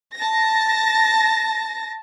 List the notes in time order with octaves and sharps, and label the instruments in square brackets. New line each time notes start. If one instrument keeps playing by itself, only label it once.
[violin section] A5 A#6